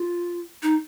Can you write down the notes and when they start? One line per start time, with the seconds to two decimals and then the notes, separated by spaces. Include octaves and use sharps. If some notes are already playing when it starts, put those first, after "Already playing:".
Already playing: F4
0.63 D#4